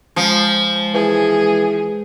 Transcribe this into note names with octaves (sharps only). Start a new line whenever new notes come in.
F3 G#3
E3 G#4